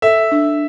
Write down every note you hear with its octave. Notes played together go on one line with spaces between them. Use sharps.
A4 E5
D4